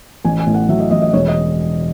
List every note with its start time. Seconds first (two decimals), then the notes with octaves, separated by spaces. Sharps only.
0.24 A1 G#5
0.39 G#5
0.47 A2
0.54 F#5
0.69 F#3 E5
0.80 D#5
0.91 A1 D#5
1.02 D#5
1.13 E1 C#5
1.28 D#5